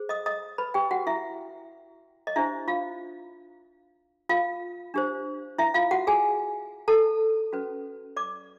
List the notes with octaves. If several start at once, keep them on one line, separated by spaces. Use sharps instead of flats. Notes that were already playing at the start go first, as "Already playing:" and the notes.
Already playing: G#4 C5
D#5 D#6
D#5 D#6
B4 B5
G4 G5
F#4 F#5
E4 E5
D#5
D4 E4 G4 C5 E5
F4 F5
F4 F5
D4 G4 C5
E4 E5
F4 F5
F#4 F#5
G#4 G#5
A4 A5
C#4 F#4 B4
D5 D6